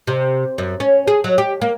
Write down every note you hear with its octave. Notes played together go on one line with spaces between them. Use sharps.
C3
F#2
C#4
G#4
F#3
G4
A#3